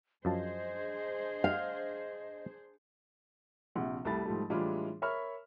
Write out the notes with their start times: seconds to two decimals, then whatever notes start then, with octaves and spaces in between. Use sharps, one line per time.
0.25 F#2 F3 D4 G#4 C5 D#5 A5
1.44 F5
3.75 A#1 C3 F#5
4.05 C2 G3 A3 B5 A6
4.25 G#2 F3 G3 A3
4.50 A2 E3 G3 G#3 D4 F4
5.02 A#4 C#5 E5 B5 C#6 F6